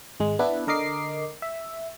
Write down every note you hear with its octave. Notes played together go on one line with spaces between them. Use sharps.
G#1 G#3
B3 D4 E4 B4
D3 A#4 D#5 D6 C7
E5